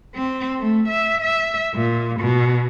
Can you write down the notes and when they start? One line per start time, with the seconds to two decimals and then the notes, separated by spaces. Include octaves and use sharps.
0.15 C4
0.59 A3
0.88 E5
1.21 E5
1.74 A#2
2.20 B2